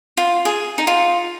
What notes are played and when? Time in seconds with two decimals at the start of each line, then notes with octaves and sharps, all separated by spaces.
0.17 F4
0.45 G#4
0.78 D#4
0.87 F4